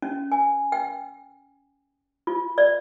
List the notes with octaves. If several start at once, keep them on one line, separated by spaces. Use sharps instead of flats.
C#4
G#5
G5
F4
D5